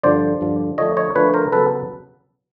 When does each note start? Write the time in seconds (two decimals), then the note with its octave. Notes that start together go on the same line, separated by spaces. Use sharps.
0.03 G2 D3 F3 C5 D5
0.41 G2 D3 F3
0.78 D3 F3 A3 D4 C#5 D#5
0.97 C#5 D#5
1.15 D3 F3 A3 D4 B4 C#5
1.34 A#4 C5
1.52 C#3 F#3 B3 A4 B4